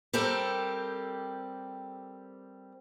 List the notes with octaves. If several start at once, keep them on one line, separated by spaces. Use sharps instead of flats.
G3 C4 G4 A4 A#4